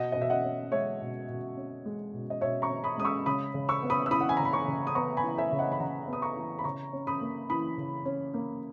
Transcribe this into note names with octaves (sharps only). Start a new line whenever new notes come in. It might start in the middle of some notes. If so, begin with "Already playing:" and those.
Already playing: B2 D#5 F#5
B2 D#5
E5
D#5 F#5
C#4
G#3 C#5 E5
B2
B2
C#4
G#3
B2
D#5
B2 C#5 E5
A#5 C#6
C#4
B5 D#6
G#3 D#6
C#6 E6
C#3 B5 D#6
C#3
C#6 E6
B3
B5 D#6
E6
E3 B5 D#6
F#5
G#5
C#3 A#5
B5
A#5 C#6
C#3
D#6
B3 A#5 C#6
G#5 B5
E3
E5 G#5
C#3
D#5 F#5
B5
C#3 F#5 A#5
B3 D#6
A#5 C#6
E3
B5
C#3 A#5 C#6
C#4
B5 D#6
A#3
E3 B5 D#6
C#3
C#4
A#3